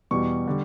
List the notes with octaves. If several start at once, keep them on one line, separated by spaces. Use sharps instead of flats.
E2 B2 G3 C#6
D3 G3